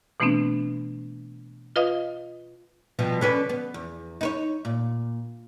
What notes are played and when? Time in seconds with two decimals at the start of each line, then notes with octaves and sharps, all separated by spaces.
0.20 B2 E3 A3 B3 C4 D4
1.76 F4 B4 D#5 F5 D#6
2.99 B2 F3 G3
3.21 D3 C#4 B4
3.49 B3
3.74 E2
4.21 D#4 B4 C#5
4.65 A#2